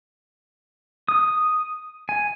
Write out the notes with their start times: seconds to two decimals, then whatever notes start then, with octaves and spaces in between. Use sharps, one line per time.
1.09 D#6
2.09 G#5